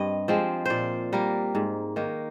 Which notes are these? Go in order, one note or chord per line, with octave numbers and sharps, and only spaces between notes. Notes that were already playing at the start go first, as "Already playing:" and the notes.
Already playing: G2 C4 D#5
F3 G#3 C4
A#2 C5 D5
G3 A#3 A#4
G#2
D#3 A#3